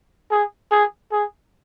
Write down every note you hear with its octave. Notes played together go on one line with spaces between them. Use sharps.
G#4
G#4
G#4